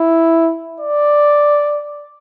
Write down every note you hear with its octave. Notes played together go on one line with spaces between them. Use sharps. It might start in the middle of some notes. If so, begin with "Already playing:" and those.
Already playing: E4
D5